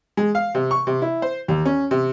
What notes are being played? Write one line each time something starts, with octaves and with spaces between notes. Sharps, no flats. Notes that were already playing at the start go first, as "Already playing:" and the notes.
G#3
F5
C3
C#6
C3
E4
C5
D#2
C#4
C3